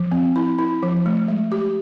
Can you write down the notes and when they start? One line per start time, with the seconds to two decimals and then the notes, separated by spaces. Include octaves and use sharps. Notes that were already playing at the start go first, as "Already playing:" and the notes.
Already playing: F3
0.12 C4
0.36 E4
0.59 E4
0.83 F3
1.06 A3
1.28 G#3
1.52 G4